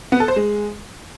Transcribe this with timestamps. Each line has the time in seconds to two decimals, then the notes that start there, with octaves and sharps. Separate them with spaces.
0.12 B3
0.20 A4
0.28 C5
0.36 G#3